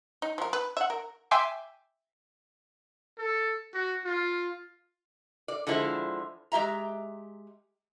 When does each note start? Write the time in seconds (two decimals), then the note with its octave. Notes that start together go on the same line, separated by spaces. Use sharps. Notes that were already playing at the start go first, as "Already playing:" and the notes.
0.22 D#4
0.38 F3 A#4
0.53 B4
0.77 E5 F#5
0.90 A#4
1.31 E5 G5 G#5 C6 D6
3.18 A4
3.74 F#4
4.05 F4
5.48 D5
5.67 D3 F3 G#3 E4 C5
6.52 G#3 G4 E5 A#5